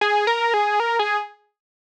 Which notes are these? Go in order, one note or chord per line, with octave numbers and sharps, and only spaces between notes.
G#4
A#4
G#4
A#4
G#4